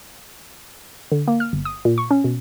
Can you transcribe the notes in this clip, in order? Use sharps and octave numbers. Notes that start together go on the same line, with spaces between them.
D3
A#3
F6
G1
D#6
A#2
C#6
C#4
B2